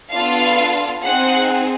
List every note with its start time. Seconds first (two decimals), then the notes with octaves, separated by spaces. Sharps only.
0.11 B3 D4 F4 A4 F5
1.04 C4 D#4 G#4 F#5